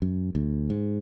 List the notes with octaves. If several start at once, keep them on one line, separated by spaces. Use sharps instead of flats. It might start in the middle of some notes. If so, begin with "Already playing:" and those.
F#2
D2
G#2